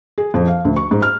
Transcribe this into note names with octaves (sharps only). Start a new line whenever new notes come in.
G#4
F2
F5
D2
C#6
G#2
F6